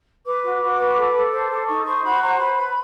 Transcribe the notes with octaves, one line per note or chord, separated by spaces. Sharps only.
B4 D6
F#4
F#4
B4
A4
A4
C5
A4
D#4 C#6
C5 C#6
F#4 B5
C5 A#5
B4 B5
B4